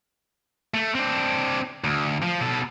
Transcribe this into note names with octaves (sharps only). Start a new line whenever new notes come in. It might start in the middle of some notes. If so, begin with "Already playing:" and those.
A3
C4 D4
D2
F3
B2 A4